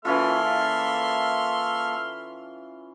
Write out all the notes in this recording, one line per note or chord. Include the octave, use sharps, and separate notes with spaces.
E3 A#3 C#4 F4 A4 E5 C6 F6